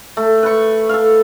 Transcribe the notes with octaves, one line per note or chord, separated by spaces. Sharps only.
A3
B4 C#6
A4 F5